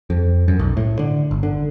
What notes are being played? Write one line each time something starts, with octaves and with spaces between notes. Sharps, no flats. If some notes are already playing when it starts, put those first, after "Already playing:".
F2
F#2
B1
A2
D3
G1
D3